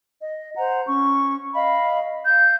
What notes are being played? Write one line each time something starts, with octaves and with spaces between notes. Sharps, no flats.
D#5
C5 F#5 A#5
C#4 C#6
D#5 F5 B5
F5 G6